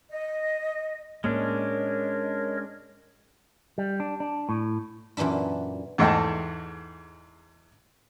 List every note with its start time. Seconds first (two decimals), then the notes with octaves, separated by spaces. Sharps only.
0.10 D#5
1.24 A2 G#3 A#3 C#4 D4 A#4 C#5 D#5
3.78 G3
4.00 D4
4.20 D4
4.49 A2
5.17 F#2 A#2 E3 D4 E4
5.98 E2 G#2 A3 D#5 G5 A5